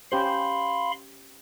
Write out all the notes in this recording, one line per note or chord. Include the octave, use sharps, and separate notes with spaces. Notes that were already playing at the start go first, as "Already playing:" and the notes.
C#4 G4 C5 F5 B5 C6